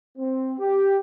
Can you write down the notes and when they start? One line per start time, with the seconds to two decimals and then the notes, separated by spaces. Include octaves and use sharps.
0.17 C4
0.60 G4